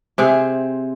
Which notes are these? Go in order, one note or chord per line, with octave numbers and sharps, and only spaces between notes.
C3 C4 G#4